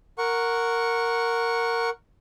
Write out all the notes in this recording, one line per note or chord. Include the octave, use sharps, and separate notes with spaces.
A#4 F#5 C#6